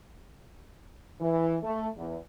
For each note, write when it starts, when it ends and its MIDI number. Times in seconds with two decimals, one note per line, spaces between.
1.21 1.57 52
1.63 1.87 57
1.97 2.17 40